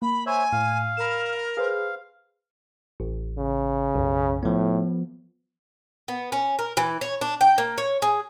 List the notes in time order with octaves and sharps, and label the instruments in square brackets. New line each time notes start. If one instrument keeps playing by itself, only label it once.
[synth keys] A#3 [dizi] B5
[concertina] C5 C#5 E5 [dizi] G#5
[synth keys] A2 [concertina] F5
[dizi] A#4 [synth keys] B5 E7
[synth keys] G#4 B4 C5 [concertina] F5
[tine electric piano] A1
[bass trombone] C#3
[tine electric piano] B1 F#2
[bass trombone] A2 [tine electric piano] F3 B3
[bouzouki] B3
C#4
A#4
E3
C#5
D4
G5
A#3
C#5
G#4